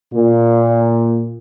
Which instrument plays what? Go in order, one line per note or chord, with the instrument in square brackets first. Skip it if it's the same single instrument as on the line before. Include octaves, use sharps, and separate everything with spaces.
[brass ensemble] A#2